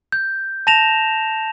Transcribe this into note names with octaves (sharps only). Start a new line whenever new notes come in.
G6
A5 A#6 E7 F7